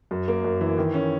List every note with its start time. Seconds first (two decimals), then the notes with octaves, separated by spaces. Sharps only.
0.11 F#2
0.28 A#3
0.44 F#2
0.61 E3
0.78 D#3
0.94 C#4